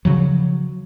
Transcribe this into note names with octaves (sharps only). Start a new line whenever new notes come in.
C#3 F3 F#3